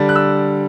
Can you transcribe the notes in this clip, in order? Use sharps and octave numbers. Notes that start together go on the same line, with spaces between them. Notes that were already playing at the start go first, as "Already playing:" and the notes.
Already playing: D3 G3 D4
F#6
E6